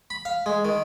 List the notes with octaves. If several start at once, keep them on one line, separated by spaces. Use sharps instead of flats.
B5
F5
G#3
D#3